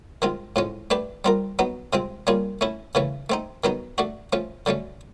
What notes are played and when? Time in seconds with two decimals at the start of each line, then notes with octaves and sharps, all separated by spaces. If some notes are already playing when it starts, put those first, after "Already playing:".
0.22 D#3 G#3 C4 F4
0.56 A2 F3 G#3 C#4
0.90 A3 D4 G4 B4
1.25 G3 C4 F4 A#4
1.59 F#3 B3 D#4
1.93 C3 F3 G#3 C4
2.27 G3 A#3 C#4 F4 G#4
2.61 A3 C#4 E4
2.95 C#3 E3 A3 C#4
3.30 A3 C4 D#4
3.64 D#3 F#3 B3 D#4
3.98 A3 D4 F#4
4.33 F3 A3 C#4
4.66 D3 F#3 A3 C#4